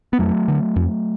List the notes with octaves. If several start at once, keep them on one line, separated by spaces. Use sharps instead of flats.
B3
F2 F#3 A3
D3
F2